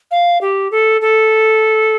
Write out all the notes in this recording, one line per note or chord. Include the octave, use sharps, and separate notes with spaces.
F5
G4
A4
A4